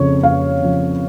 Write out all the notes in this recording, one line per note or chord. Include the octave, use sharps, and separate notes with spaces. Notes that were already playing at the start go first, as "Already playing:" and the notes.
Already playing: F2 C#3 F3 C#5
F2 F5
C#3 F3